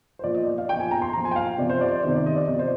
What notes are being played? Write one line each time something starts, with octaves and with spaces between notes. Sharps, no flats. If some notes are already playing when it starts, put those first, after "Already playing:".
C5
A#2 F3 D5
D#5
D5
F5
A#2 F3 G5
G#5
A#5
C6
A#2 F3 A#5
G#5
G5
F5
C3 F3 D5
C5
D5
D5
C3 D#3 C5
D5
D#5
D5
C3 F3 D5
C5